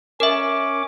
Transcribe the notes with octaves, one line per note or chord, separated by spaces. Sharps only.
C#4 A#4 E5 D6